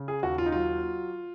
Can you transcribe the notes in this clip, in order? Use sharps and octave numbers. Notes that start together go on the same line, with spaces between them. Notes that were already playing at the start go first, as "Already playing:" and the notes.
Already playing: C#3
G#4
D#2 F#4
F4
D#4
F#3 F4